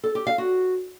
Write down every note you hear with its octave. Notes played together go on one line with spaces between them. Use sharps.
A4
G4
F5
F#4